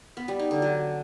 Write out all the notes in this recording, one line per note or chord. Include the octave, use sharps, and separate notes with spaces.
B3
G3
D#4
D3
F#3